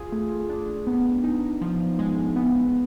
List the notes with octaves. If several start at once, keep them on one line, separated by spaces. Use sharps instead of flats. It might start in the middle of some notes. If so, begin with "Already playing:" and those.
Already playing: F4 G#4
A3
D4
B3
D#4
F3
G#3
B3